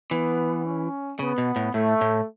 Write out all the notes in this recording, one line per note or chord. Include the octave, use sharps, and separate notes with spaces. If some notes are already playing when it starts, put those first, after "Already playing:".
E3 B3
C#4
C#3 B3
B2
A2
A2 A3
A2